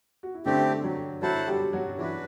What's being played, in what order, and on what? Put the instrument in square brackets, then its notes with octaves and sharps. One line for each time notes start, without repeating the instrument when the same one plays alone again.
[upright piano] F#4
E4
[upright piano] D3 D4 [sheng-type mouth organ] A3 C4 G4
[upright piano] F#3 F#4
[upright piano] F#3 F#4 [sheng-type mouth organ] E4 A4 C5 F#5 A5
[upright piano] G3 G4
F#3 F#4
[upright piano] E3 E4 [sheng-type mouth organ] D4 F#4 B4